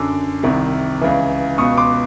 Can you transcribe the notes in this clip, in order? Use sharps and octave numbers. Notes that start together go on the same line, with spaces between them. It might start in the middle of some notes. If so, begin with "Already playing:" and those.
Already playing: F#2 D3 D6 E6
C2 C3 D#3
C#2 C#3 E3
C#2 B2 C#6 D#6
C6 D6